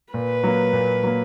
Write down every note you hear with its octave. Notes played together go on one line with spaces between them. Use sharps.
A#2 B4
F#3 A#3
A#2
F#3 A#3